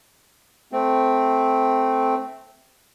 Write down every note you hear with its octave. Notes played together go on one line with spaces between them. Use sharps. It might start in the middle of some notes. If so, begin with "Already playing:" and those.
A3 C4